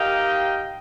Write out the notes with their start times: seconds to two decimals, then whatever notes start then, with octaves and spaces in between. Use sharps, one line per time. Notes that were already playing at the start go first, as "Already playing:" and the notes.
Already playing: D#4 G4 A#4 D#5 F5 G5